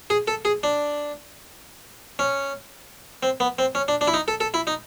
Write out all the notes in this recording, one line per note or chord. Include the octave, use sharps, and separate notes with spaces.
G#4
A4
G#4
D4
C#4
C4
B3
C4
C#4
D4
D4
E4
D#4
A4
A4
E4
D#4